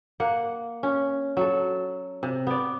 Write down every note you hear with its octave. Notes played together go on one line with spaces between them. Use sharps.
A#3 F#5
C#4
F#3 A4
C3
B3 D5